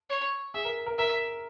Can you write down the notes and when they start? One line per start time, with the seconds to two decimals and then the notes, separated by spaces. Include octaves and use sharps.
0.09 C#5
0.54 G#4 E5
0.65 A#4
0.86 A#4
0.98 A#4 E5